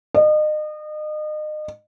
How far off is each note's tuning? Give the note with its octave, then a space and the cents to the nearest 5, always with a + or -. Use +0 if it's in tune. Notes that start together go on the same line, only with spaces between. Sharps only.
D#5 -35